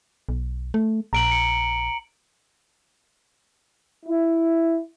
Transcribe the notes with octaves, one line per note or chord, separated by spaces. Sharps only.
B1
A3
A#1 A#5 D7 F#7
C#7
E4